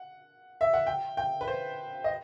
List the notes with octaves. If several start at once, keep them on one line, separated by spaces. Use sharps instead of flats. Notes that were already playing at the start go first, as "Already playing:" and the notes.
Already playing: F#5
E5
F#5
G5
G5
B4
C5
D#5